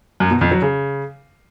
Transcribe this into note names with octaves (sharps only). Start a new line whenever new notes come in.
F#2
B2
F2
F#3
C#3